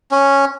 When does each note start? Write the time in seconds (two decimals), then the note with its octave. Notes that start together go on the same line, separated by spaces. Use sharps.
0.11 C#4